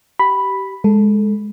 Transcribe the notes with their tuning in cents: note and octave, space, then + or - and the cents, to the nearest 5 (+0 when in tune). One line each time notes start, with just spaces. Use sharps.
G4 -25 B5 +0
G#3 +0 A4 +0